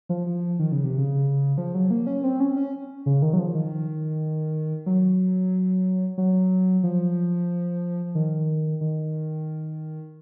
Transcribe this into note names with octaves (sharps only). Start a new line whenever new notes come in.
F3
F3
D#3
C#3
C3
C#3
F3
F#3
A#3
C#4
C4
C#4
C#4
C#3
D#3
F#3
F3
D#3
F#3
F#3
F3
D#3
D#3